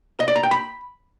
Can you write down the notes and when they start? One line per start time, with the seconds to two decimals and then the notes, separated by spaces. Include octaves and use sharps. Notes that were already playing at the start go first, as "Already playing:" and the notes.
0.20 D#5
0.28 D5
0.36 A#5
0.43 G5
0.51 B5